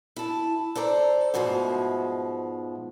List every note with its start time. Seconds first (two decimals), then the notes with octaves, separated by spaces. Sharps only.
0.16 E4 A5
0.75 A4 C5 D5 A#5
1.34 G#2 B2 F3 G#3 A3